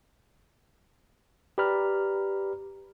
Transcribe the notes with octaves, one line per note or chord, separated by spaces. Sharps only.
G4 B4 D5 A#5 B5 F6